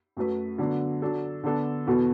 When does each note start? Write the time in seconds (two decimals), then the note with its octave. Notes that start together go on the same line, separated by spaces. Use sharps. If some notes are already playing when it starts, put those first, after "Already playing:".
0.17 F#2 F#3 A3 F#4 B4
0.58 D3 F#3 B3 D4
1.02 F#3 D4 A4
1.43 D3 B3 D4 A4
1.87 E2 B2 B3 F#4 A4